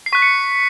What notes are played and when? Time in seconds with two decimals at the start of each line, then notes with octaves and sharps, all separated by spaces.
0.06 C7
0.13 C#6 F#6 B6
0.22 C#7